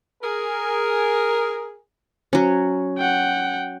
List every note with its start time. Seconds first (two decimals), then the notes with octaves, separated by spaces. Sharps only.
0.22 G#4 A#4
2.33 F#3 C#4
2.97 F#5 G5